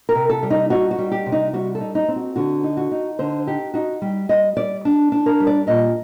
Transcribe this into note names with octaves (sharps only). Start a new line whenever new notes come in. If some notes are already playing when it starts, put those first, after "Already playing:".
A#4
C3
A4
G3
D#4
D#4 F#4
F#4
G3
G4
C3
D#4
G3 F#4
A4
D#4
D#4
C4
F#4
D3 F#4
D#4
F#4
D#4
D3 C5
D#4 G4
D#4 F#4
G3
G3 D#5
G3 D5
D4
D4
A#4
G3
D5
A#2 D#5